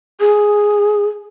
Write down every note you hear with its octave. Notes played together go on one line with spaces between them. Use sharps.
G#4